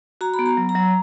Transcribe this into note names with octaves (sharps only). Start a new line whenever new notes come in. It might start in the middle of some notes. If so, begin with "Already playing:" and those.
F#4 A#5
B5
B3
A#5
F#3
A#5
F#3